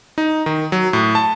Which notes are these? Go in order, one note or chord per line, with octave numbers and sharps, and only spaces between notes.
D#4
D#3
F#3
A2
A5